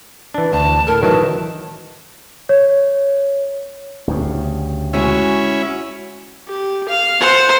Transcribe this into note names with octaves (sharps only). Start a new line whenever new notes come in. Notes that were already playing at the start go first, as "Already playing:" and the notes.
E3 D4
D2 A5
A2 A4 A#4
D#3 E3 F#3 A5
C#5
D2 G2 C#3
G#3 C#4 E4 F#4 G#4
G4
F5
C5 F#5